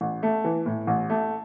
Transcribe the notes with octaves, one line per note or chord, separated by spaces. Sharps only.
A1
A3
E3
A2
A1
A3